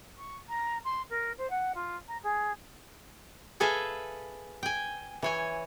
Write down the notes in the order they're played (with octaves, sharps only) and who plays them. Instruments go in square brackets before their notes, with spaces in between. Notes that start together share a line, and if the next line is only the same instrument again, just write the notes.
[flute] C#6
A#5
C6
A#4
C5
F#5
F4
A#5
G#4
[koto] G#4 A4 B4 E5 F5 G#5
G5 G#5
E3 C#5 G#5